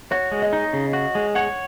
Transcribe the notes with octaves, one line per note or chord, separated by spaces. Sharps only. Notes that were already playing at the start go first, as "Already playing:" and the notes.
F#4 C#5
G#3
D#5
D#4
C#3
F#4
G#3
C#5 F#5